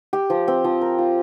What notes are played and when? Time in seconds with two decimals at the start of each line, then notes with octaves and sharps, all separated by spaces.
0.13 G4
0.30 F3
0.48 C4
0.64 F3
0.81 A#4
0.98 F4